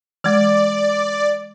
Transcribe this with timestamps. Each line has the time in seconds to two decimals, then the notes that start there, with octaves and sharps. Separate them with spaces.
0.24 E3 G#3 D5